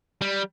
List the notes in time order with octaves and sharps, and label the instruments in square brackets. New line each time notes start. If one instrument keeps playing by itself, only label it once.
[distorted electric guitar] G3